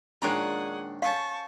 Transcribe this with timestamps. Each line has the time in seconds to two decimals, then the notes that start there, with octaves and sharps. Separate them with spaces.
0.22 A#1 D#3 G#3 C#4 D4 G#4 F#5 A#5
1.02 C#4 A4 C5 F5 A5 C#6